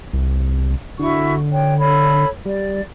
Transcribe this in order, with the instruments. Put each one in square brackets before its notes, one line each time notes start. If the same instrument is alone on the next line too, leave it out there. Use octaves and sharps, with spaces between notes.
[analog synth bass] C2
[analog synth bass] D3 [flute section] E4 F#4 C#6
[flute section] C#5 G5
A4 C#5 B5
[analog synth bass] G3 [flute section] D5